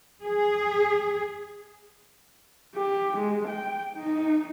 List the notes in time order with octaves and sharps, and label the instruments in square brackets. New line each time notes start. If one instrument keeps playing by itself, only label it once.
[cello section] G#4
[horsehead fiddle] G4
G#3
G5
D#4